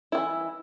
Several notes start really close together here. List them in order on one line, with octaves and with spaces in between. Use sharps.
E4 D#3 E3